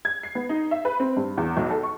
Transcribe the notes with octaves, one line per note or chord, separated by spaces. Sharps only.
G#6
C7
B3
D#4
E5
B4
C4
G2
E2
B1
A4
C#6